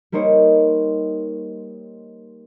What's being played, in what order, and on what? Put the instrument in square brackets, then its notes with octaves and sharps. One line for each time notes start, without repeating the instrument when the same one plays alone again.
[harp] G3 A#3 D#4 C5 C#5